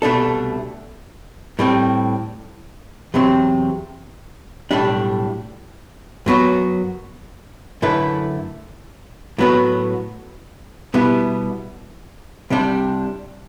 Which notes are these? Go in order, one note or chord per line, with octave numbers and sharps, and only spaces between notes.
C2 B2 A3 D4 A4
A2 G3 C4
E2 C3 F#3 C4
B1 A2 G3 D4 G4
F#2 F#3 B3 F#4
F#2 D3 A3 E4 B4
A2 F#3 B3 F#4 B4
B2 G3 B3 E4
C2 C3 G3 D4